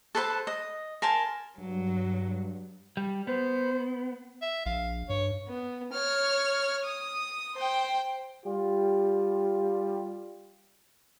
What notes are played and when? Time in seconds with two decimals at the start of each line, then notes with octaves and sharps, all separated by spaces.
0.15 A4 B4 C5 A5
0.47 D#5
1.02 A#4 G#5 A5 C6
1.58 G2 F#3
2.97 G3
3.27 B3 C5
4.42 E5
4.66 A#1 F5
5.09 G2 C#5
5.48 B3
5.93 C#5 F6
6.85 D#6
7.55 C5 G5
8.45 G3 F4 G4